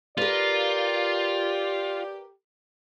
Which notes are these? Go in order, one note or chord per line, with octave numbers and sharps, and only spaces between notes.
F4 G4 A#4 B4 D5